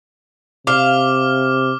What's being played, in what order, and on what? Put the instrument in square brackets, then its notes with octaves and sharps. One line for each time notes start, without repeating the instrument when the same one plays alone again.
[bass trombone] C3 [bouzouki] F5 [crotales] D6 F6